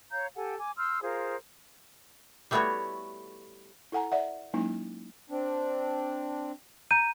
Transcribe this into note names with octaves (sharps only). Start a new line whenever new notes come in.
C#5 F5 A#5 G6
G4 A4 F#5 G#5
G#5 D6
C6 E6 F6 G6
F4 G#4 A#4 C5
G3 A3 B3 E4 F#4 C#5
E4 A4 F#5 G#5 A#5
D5 E5 F#5
F#3 G#3 A#3 C#4 D#4 E4
C4 D4
A#5 G6 D#7